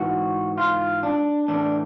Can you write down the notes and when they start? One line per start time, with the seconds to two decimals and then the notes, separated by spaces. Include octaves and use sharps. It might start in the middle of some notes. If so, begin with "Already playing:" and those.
Already playing: G#2 E3 F#4
0.58 F4
1.03 D4
1.48 A2 E3 D4